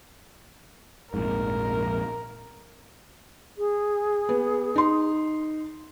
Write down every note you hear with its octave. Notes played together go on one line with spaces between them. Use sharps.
A#1 F2 G#2 A#4
G#4
B3
D#4 C6